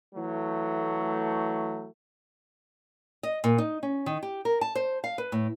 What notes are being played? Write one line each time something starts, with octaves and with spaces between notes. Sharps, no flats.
E3 F#3 A3
D#5
A#2
D#4
C#4
D#3
G4
A#4
A5
C5
F5
B4
A2